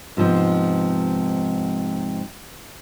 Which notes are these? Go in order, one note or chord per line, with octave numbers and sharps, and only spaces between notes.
G#2 C3 F3 B3